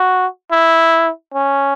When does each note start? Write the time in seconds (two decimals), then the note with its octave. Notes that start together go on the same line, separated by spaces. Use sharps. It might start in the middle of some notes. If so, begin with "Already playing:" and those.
Already playing: F#4
0.52 E4
1.34 C#4